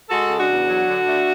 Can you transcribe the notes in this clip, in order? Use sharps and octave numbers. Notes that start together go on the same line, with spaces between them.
G#3 F#4 A4
C#3
D4 F#4
E2
F#3
D3
A3